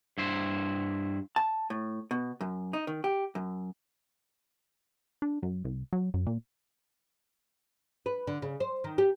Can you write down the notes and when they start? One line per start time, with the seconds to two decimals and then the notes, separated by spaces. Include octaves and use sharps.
0.18 G2 E4 C5
1.36 A5
1.70 A2
2.11 B2
2.41 F#2
2.73 D#4
2.87 D#3
3.04 G4
3.35 F#2
5.22 D4
5.43 F#2
5.65 C2
5.93 F#3
6.14 F#2
6.27 A#2
8.06 B4
8.27 D3
8.42 C#3
8.60 C5
8.84 D#3
8.98 G4